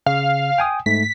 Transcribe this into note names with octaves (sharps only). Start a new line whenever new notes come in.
C#3 F5
G5 G#5 D#6
G#2 A3 B6